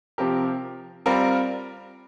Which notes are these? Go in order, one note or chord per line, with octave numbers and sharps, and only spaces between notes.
C3 F3 C4 G4 A#4
G3 C4 F4 A#4